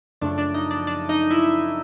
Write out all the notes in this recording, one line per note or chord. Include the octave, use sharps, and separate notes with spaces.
F#2 C#3 F3 A3 D4 D5
D4 D5
D#4 D#5
D4 D5
D4 D5
D#4 D#5
E4 E5